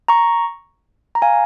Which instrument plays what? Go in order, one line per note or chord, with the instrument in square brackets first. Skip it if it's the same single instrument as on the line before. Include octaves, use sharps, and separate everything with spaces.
[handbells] A#5 C#6
A#5
F5 G#5